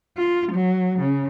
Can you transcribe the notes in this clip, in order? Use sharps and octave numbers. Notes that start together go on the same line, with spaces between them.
F4
F#3
C#3